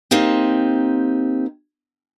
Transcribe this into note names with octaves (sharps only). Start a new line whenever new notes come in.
A#3 C4 D#4 G4